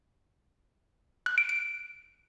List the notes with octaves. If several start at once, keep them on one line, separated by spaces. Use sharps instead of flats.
F#6
D7
D7